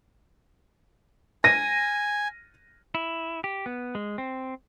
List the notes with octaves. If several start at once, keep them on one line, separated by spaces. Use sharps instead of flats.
G#5 A#6 D#7
E4
G4
B3
G#3
C4